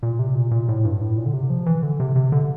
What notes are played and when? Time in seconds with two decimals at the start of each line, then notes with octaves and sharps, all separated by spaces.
0.03 A#2
0.19 C3
0.35 A#2
0.51 A#2
0.68 A2
0.85 G2
1.01 A2
1.17 A#2
1.26 D3
1.33 C3
1.50 F3
1.66 E3
1.83 D3
2.00 C3
2.16 C3
2.32 D3